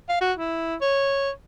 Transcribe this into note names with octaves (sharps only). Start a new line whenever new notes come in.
F5
F#4
E4
C#5